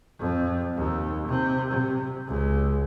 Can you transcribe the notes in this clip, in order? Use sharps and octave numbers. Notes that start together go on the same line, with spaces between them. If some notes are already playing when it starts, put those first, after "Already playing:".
F2
D#2
C3
C3
C#2